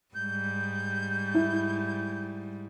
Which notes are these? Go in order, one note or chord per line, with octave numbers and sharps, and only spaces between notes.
G#2 G3 G6
E4